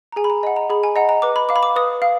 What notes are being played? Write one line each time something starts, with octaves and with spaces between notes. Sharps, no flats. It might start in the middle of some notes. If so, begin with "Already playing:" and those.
A#5
G#4 G#5
B5
A#5
D#5 F#5 G#5
A#5
G#4 B5
G#5
D#5 F#5 A#5
A#5
B4 D6
B5
F5 D6
B5
D6
B4 D#6
F5